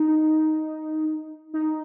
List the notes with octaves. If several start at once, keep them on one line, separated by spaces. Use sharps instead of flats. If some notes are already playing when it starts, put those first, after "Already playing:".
Already playing: D#4
D#4